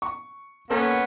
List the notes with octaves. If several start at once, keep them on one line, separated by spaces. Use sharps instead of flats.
C#6
A#3 B3 C#4 A4 A#4